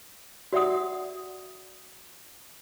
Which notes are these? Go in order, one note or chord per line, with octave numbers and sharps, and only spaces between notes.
F#4 D5 E5 F#5 D#6